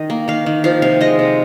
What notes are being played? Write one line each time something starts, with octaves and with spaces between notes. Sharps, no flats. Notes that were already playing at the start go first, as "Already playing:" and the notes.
Already playing: D#3 D#5
A#3
D#3 F5
D#3
F3 F5
C3 F5
G#3 D#5
C3